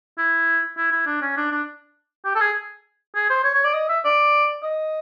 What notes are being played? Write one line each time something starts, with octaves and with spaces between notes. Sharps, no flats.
E4
E4
E4
D4
C#4
D4
D4
G4
A4
G#4
G#4
C5
C#5
C#5
D5
D#5
E5
D5
D#5